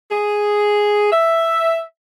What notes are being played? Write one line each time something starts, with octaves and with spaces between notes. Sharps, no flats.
G#4
E5